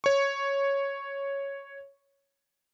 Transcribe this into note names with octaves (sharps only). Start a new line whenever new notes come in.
C#5 C#6